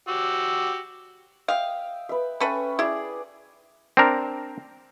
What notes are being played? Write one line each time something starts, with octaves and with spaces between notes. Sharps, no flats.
F#4 G4 E6
E5 F5 G5 D#6
B4 E5
C#4 A4 B4 E5 G5
E4 G#4 D5
C4 D4 A#4